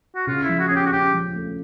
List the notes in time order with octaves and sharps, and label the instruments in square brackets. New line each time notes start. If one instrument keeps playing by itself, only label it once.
[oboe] F#4
[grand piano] C#3 [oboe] F4
[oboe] E4
[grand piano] F3
[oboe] F#4
[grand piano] C#4 [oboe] G#4
[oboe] G4
F#4
[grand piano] C#4 [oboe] G4
[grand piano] F3
A3